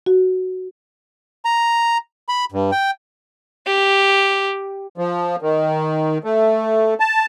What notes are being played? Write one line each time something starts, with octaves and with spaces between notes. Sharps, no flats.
F#4
A#5
B5
G2
G5
G4
F3
D#3
A3
A5